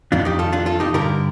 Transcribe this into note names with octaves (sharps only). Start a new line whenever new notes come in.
F2 D#3 D4 F4
D#4 G4
F4 A4
D4 F4
F4 A4
D#4 G4
G2 D3 G4 A#4